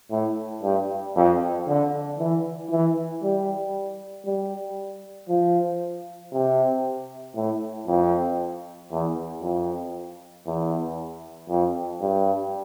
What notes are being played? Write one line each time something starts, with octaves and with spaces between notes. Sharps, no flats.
A2
G2
F2
D3
E3
E3
G3
G3
F3
C3
A2
F2
E2
F2
E2
F2
G2